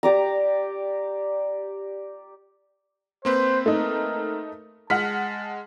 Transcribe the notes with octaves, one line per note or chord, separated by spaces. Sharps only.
G4 D5 A#5
A#3 C4 B4 C5
A3 D#4 A#4
G#3 F#5 A5 F6 B6